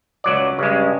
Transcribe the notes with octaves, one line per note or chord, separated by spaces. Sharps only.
C#2 F#3 D5
G2 C#3 G#3